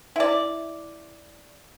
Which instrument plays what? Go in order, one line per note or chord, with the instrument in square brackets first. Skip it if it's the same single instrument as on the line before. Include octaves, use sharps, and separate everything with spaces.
[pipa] E4 D5